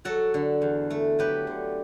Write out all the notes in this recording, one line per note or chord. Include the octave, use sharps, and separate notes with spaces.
F#3 F#4 A4
D3
E2
A3
F#3 G4 B4
D3